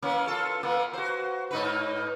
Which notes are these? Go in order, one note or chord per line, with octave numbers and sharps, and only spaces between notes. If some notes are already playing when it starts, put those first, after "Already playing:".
E3 A#3 C#4
F4 A4
E3 A#3 B3
F#4 C5
G#2 D#4 B4